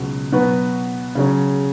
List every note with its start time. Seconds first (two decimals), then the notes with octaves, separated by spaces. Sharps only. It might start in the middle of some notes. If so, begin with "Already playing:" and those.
Already playing: C#2 B2 F#3
0.32 B2 F#3 B3 F#4 B4
1.15 C#3 F#3 C#4